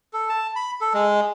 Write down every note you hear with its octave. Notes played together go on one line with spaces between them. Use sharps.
A4
A5
B5
A4
G#3